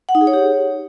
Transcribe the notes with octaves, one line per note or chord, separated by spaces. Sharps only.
F#5
D#4
G#4
C#5
G4